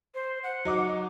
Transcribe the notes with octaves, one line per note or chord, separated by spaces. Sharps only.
C5
F#5
F#3 D#4 D6